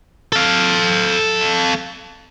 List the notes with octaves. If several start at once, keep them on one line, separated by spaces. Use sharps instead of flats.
A4 F5